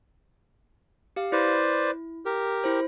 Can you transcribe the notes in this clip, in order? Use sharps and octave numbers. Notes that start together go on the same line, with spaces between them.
G4 F5
E4 B4 C5 D5
G4 A#4
E4 C5